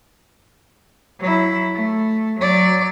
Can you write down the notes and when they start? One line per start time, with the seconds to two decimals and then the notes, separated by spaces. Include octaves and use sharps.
1.19 F#3 E4
1.75 A3
2.40 F#3 D5